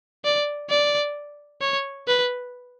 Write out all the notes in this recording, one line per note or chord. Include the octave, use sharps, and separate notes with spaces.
D5
D5
C#5
B4